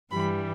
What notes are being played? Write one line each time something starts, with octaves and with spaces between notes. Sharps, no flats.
G2 E3 G3 B5